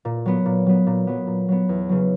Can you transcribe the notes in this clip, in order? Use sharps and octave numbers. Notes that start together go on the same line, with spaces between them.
A#2
F#3 B3
A#2
F#3 B3
A#2
F#3 B3
A#2
F#3 B3
E2
C#3 F#3